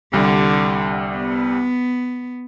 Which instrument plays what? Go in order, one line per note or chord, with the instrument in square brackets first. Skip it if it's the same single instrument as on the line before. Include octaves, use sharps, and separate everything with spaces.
[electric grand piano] C2 G3 [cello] D3
[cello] B3